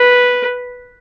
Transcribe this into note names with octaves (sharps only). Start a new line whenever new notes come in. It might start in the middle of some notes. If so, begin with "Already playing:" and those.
Already playing: B4